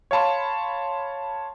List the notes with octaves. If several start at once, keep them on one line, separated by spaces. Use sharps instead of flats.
C#5 F5 A5 B5 C6